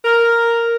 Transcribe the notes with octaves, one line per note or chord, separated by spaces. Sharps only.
A#4